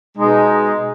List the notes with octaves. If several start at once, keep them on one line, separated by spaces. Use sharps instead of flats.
B2 G#3 D#4